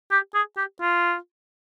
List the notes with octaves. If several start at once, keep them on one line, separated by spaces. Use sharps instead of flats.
G4
G#4
G4
F4